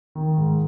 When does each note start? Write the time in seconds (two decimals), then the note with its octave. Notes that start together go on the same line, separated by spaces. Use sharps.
0.15 D#3
0.38 G#2